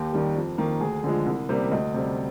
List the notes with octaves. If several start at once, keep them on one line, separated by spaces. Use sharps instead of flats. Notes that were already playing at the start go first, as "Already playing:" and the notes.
Already playing: D#2 G4
D#3 G3
F2
D#3 A#3
D2 G#4
D3 F3 G#3
C2
C3 G3 A#3
D2 D#5
C3 G3